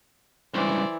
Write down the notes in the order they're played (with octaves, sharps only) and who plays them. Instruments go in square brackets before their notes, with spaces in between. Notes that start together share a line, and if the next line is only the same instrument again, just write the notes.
[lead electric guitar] C#2 G2 [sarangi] E3 [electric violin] C5 D5